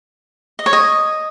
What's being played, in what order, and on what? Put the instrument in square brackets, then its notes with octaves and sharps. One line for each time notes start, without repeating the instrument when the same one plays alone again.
[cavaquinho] D#5
C#5
D#5